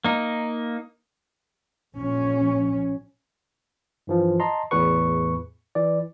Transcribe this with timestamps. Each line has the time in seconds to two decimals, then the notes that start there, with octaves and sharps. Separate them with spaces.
0.04 A#3 D#4
1.95 A#1 C#4
4.07 G2 E3 F3
4.40 D#5 A5 A#5 C6
4.71 A1 E2 A2 G#4 B4 C#6
5.75 E3 D5